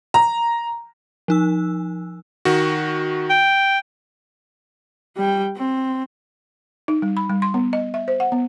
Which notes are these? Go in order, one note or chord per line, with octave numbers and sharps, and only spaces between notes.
A#5
F3 D#4 E6
D#3 F#4
G5
G3 G5
C4
D#4
G3
B5
G3
C6
B3
D#5
E5
C5
F#5
B3